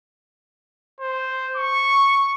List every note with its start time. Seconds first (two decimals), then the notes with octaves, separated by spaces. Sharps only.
1.01 C5
1.56 C#6